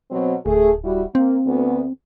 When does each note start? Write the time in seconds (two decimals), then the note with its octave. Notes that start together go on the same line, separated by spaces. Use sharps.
0.11 B2 F#3 C4
0.46 D1 A3 G#4
0.84 G3 E4 F#4
1.15 A#3 C4
1.46 D2 B3